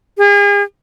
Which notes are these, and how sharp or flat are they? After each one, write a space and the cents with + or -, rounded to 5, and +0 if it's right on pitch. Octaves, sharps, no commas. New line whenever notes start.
G#4 -40